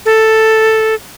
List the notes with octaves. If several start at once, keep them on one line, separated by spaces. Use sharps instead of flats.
A4